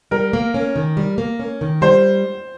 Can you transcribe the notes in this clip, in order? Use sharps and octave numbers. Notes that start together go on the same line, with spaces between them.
G3 A#4
A#3
C#4
D#3
G3
A#3
C#4
D#3
G3 C5